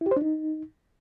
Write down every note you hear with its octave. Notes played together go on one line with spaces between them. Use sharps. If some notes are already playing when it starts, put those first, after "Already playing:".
E4
G4
C5
D4
D#4